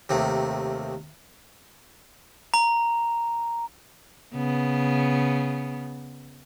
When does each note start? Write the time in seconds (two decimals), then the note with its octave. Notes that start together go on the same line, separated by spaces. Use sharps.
0.09 D#2 C3 D#3 A3
2.54 A#5
4.34 C#3 B3